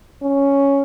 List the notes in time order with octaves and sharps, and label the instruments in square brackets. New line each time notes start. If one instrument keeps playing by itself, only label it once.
[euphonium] C#4